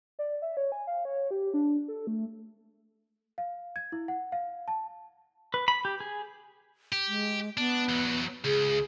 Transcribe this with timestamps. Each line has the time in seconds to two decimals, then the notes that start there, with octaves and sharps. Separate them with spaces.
0.19 D5
0.42 E5
0.57 C#5
0.72 G#5
0.87 F5
1.05 C#5
1.31 G4
1.54 D4
1.88 A4
2.07 A3
3.38 F5
3.76 G#6
3.92 E4
4.08 F#5
4.32 F5
4.68 A5
5.54 B4
5.68 B5
5.85 G4
6.00 G#4
6.92 G4
7.08 G#3
7.57 B3 D4
7.89 E2 F#3
8.44 C#2 G#4